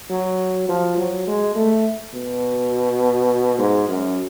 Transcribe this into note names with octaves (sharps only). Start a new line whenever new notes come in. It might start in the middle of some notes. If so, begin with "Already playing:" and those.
F#3
F3
F#3
G#3
A3
B2
G#2
F#2